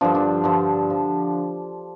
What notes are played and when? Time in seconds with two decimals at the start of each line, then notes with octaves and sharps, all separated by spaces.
0.01 G2 D3 F3 D4
0.15 D4
0.44 G2 D3 F3
0.90 F3